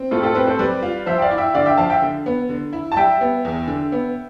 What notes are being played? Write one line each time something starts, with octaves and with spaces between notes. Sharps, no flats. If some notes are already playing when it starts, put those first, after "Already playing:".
Already playing: C4
A2 F4 A4
G4
F4 A4
C4 G4 B4
A4 C5
G3 B4 D5
F4
F3 C5 E5
G5
D5 F5
E4
E5 G5
D3 D5 F5
E5 G5
F3 F5 A5
E5 G5
D3
B3
D3
E4
A5
G3 E5 G5
B3
E2
D3
B3